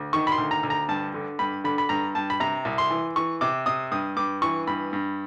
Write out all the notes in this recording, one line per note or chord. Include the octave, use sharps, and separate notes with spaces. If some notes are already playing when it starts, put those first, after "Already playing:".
Already playing: D2
D#3 C#6
B5
C6
D2
A#5
D2
A#5
G2 A5
D3
G2 B5
D3 B5
B5
G2 A#5
G2 A5
B5
C3 A#5
C2
C6
E3
E3 C#6
C3 D6
C3 D#6
G2 D#6
G2 D6
E3 C#6
G2 B5
G2